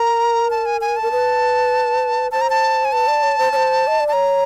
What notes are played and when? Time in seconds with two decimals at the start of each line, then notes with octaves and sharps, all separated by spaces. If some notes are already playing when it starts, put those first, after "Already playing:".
Already playing: A#4 A#5
0.50 A5
0.66 G#5
0.81 G#5
0.96 A5
1.02 A#4
1.12 B4
2.32 C5 A5
2.41 A#5
2.50 A5
2.85 G#5
2.92 B4 A5
3.08 D5
3.23 C#5
3.38 C5
3.52 C#5
3.56 C5
3.87 D#5
4.00 D5
4.08 A5
4.13 C#5 A#5